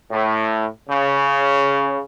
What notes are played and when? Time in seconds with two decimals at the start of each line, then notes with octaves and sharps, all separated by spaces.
0.12 A2
0.90 C#3